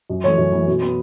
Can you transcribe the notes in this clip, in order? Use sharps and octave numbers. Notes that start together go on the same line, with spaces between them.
F#2
E3 A3 C#5
F#2
E3 A3
B2
B3